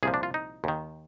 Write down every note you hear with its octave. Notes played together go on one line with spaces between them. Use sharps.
C2 A#2 F3 G#4
D4
F4
D#4
D#2 D#3